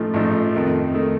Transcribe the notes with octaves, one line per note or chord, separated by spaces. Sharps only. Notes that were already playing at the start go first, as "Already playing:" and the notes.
Already playing: A1 A2 F3 A3 D#4
A1 A2 F3 A3 D#4
F2 D#3 A3
D#3 A3